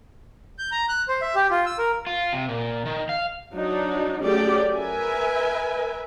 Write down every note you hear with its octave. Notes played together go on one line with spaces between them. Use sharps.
G6
A#5
F#6
C5
E5
G4
F4
E6
A#4
F4
C3
A#2
D#3
F5
F#3 D4 D#4
F#3 A3 C#4 G4 G#4 D5
A#4 B4 E5 G#5